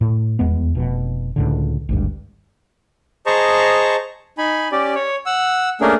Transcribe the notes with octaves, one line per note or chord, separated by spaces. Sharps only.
A2
D#1 E2 G#3 B3
F1 B2
C#2 A2 D3
G#1 D2 G2
G#4 C5 D#5 A5 A#5 C#6
D#4 G#5 B5
C#4 G4 D5
C#5
F#5 E6
A3 A#3 C#4 D4 G#4 A#4